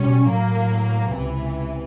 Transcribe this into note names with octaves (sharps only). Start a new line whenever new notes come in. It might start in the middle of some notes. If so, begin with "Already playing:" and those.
Already playing: B2 G3 C#4
A2 F#3 A#3
C#2 C3 E3